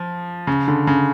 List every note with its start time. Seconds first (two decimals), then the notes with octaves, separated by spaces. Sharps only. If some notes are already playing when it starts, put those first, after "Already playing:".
Already playing: F3
0.47 C#3
0.68 D3
0.87 C#3